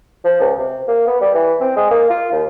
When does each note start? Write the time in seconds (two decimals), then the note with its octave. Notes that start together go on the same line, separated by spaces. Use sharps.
0.25 F3
0.40 C#2
0.58 C3
0.88 A#3
1.07 B3
1.21 G3
1.34 E3
1.61 C4
1.76 G#3
1.91 A#3
2.10 F4
2.32 D#2